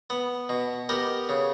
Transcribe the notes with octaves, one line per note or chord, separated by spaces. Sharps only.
B3
B2
B3 G4 A#4
C#3